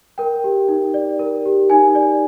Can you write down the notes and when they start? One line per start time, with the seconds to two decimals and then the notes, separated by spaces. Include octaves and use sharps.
0.18 A#4 G5
0.44 G4
0.68 D#4
0.94 D5
1.19 A#4
1.46 G4
1.70 D#4 G#5
1.95 D5